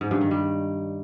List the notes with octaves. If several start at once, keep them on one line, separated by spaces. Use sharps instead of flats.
G#2
G2
D#3
G3